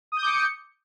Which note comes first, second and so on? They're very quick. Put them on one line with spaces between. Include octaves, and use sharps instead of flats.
D#6 G6 D6 C#7